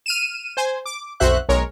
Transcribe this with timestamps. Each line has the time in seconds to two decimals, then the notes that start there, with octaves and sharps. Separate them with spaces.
0.06 F6 D#7 E7
0.57 C5 G#5
0.86 D6
1.20 B1 F2 F#4 C5 E5 F#6
1.49 B1 G#3 A#4 C#5